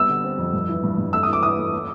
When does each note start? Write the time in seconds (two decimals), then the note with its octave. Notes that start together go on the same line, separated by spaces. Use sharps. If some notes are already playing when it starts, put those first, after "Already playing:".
Already playing: G3 B3 E6
0.09 D3
0.24 C4
0.38 F2
0.53 G2
0.69 E3
0.84 G2
0.98 G2
1.13 A3 E6
1.23 E3 D#6
1.33 D6
1.43 E3 D#6
1.58 A3
1.73 A3